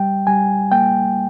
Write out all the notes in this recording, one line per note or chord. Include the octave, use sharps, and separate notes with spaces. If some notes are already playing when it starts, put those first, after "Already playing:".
Already playing: G3 G5
G3 G#5
A#3 G5